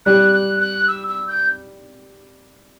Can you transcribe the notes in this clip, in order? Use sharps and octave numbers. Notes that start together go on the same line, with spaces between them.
G3 F#6
F#6
F#6
E6
E6
G6